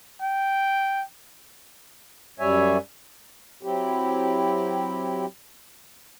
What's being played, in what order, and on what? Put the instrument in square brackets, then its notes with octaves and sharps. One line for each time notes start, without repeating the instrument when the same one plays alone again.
[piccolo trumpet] G5
[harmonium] F#2 G3 C#5 E5 G#5
F#3 C4 E4 G4